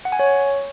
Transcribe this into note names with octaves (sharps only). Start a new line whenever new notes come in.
F#5
G#5
C#5